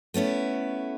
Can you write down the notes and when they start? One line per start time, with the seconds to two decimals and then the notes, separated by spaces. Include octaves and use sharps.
0.14 A3 B3 C#4 E4